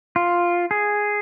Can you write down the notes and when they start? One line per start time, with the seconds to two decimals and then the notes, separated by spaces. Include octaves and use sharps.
0.16 F4
0.71 G#4